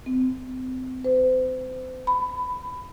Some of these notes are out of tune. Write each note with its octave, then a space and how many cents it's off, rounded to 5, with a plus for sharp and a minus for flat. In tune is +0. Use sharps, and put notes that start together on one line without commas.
C4 -30
C5 -35
B5 +20